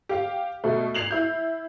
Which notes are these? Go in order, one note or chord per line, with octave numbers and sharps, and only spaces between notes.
G4 F5
B2 A3
G#6 C7 F7 F#7
E4 G6